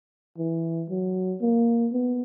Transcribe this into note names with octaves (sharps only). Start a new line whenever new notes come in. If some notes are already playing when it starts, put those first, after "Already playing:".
E3
F#3
A#3
B3